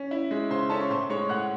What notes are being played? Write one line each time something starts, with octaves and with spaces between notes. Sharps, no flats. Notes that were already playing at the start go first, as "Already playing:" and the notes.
Already playing: C#4
E4
G#3
C#3 C5 C6
C#4 A4 A5
C#6
A2 C5 C6
G#3 C#5 C#6
A2 F#5 F#6